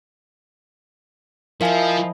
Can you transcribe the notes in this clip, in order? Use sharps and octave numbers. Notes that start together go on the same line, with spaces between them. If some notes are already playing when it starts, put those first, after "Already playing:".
F3 E4 A#4 D#5 F5 G#5